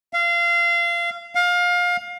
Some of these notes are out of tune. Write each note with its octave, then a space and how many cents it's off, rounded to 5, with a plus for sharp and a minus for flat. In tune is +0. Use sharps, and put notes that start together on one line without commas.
F5 -25
F5 +25